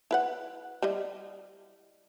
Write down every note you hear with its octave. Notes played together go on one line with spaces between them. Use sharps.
E4 B4 F#5
G3 E4 D#5